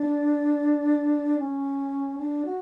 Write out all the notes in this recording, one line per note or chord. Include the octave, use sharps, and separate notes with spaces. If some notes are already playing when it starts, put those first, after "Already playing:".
Already playing: D4
C#4
D4
F#4